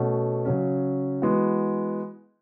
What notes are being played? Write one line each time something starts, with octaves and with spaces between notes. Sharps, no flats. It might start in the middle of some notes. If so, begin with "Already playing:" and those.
Already playing: B2 A3 C#4 F#4
C#3 F#3 C#4
E3 G#3 B3 F#4